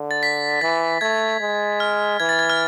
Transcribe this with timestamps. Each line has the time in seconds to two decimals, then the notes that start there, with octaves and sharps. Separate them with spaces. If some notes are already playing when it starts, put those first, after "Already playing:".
Already playing: D3
0.11 A6
0.23 B6
0.61 E3 A6
1.01 A3 G#6
1.40 G#3
1.80 F6
2.20 E3 G#6
2.29 A6
2.39 G#6
2.50 F6